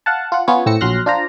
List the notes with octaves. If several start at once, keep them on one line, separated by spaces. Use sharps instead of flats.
F5 F#5 A5
F4 F#5
B3 C#4 F4 C#5
A2 C4 E6 A#6 C#7
A#1 F#3 C6 F6 F#6 A#6
D4 F4 C5 A#5